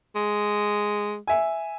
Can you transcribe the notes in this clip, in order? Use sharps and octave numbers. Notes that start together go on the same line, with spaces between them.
G#3
E5 G#5